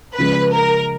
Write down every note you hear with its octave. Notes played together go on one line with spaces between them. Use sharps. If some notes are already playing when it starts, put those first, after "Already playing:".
C#3 F3 G#3 B4
A#4